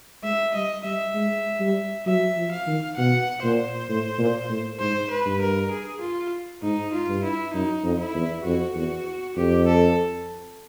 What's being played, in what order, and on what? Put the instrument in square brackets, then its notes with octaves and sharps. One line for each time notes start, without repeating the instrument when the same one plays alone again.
[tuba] G#3 [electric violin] E5
[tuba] G3 [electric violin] D#5
[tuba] G3 [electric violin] E5
[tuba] G#3
G3
[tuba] F#3 [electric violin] E5
[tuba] F3
[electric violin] F5
[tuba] D#3
[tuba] B2 [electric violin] F#5
[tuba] A#2 [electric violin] C5
[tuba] A2
A#2
A2
[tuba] G#2 [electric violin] C5
[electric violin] B4
[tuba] G2
[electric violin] A#4
G#4
F4
[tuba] G#2 [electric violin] D#4
[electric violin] F4
[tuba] G2
[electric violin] E4
[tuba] F#2 [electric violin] D#4
[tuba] F2
[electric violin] E4
[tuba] E2
[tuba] F2 [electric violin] F#4
[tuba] E2
[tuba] F2 [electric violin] G4
[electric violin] A4